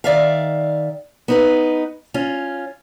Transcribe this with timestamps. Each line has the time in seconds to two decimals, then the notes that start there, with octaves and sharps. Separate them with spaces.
0.04 D#3 D5 E5 F5
1.28 B3 D#4 B4
2.14 C#4 F4